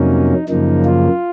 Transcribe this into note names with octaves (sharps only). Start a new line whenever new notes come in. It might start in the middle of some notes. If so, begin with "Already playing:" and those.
Already playing: F2 C3 F#3 A#3 C#4 D#4
F#2 C#3 F3 A#3 D#4
F4